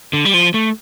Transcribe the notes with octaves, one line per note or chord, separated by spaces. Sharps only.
D3
G3
F3
A3